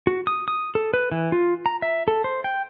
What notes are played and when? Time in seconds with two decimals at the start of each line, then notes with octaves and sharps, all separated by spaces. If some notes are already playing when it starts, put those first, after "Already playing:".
0.07 F#4
0.27 D#6
0.48 D#6
0.75 A4
0.94 B4
1.12 E3
1.32 F4
1.66 A#5
1.82 E5
2.08 A4
2.24 C5
2.44 G5